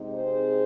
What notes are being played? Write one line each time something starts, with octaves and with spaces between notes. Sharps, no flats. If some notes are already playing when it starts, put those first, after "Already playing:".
Already playing: C3 G#3 C4 D#4
G#4 C5